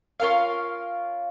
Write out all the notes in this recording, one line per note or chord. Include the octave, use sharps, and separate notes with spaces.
C#4 F4 A#4 F5